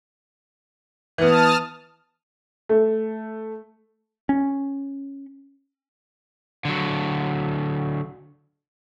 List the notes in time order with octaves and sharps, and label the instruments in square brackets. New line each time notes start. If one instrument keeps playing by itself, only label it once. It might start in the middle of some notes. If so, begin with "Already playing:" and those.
[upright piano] E3 B3 [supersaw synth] A5 D#6 F6
[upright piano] A3
[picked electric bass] C#4
[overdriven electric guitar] D3 F#3